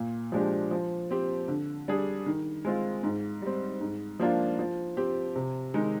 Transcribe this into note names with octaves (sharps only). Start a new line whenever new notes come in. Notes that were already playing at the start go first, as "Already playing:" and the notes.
Already playing: A#2
F3 G#3 D4 G4
F3
C4 G4
D3
G3 D4 G#4
D#3
G#3 C4 F4
G#2
G3 C4
G#2
F3 A#3 D4 F4
F3
C4 G4
C3
D#3 G#3 D#4